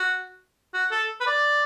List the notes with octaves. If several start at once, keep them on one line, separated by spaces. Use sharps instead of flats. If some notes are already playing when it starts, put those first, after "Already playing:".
Already playing: F#4
F#4
A4
B4
D5